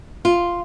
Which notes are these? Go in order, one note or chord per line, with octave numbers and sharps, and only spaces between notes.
F4